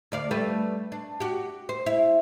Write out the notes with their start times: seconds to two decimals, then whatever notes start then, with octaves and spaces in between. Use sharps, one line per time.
0.12 D2 D5 F5
0.31 G3 A3 B4
0.92 D4
1.20 F#4 G4
1.69 C5
1.86 E4